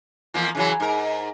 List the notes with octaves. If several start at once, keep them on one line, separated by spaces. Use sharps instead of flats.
E2 F3 A#3
C#3 E3 F#3
G#2 A#4